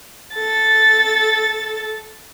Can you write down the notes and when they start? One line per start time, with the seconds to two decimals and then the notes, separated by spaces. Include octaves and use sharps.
0.34 A4 A6